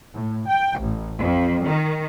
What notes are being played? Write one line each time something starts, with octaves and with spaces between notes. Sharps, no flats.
A2
G5
A1
F2
D#3